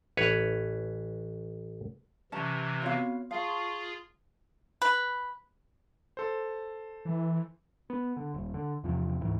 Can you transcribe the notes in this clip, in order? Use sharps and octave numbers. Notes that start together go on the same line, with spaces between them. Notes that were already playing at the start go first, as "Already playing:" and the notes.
A1 B4 C#5
C3 E3 C#4 A5 A#5
B3 C4 F4 F#4 C#5 F5
F4 G#4 F5 A5 C#6
B4
A4 C5
E3
B3
D3
D#1
D3
E2 C3 F3
D2 G#2 E3